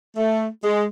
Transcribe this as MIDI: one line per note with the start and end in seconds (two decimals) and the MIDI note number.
0.17 0.47 57
0.64 0.84 56